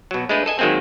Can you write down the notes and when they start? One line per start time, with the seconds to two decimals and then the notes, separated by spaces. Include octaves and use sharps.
0.11 B2 F#3
0.29 G#3 A3 D4 B4 D#5
0.46 A4 D#5 G#5
0.59 D#3 F#3 G#3 A#3 C4